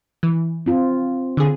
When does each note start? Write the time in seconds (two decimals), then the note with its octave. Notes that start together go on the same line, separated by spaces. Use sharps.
0.23 E3
0.66 C4 F4
1.37 D3 G#4